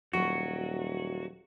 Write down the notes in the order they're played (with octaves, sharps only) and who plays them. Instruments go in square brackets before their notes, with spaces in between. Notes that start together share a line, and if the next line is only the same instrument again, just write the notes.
[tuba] D#1 [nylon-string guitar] F#3 [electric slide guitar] F#4